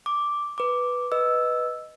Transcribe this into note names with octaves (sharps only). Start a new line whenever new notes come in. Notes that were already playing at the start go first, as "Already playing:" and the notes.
D6
B4 D6
B4 D#5 E6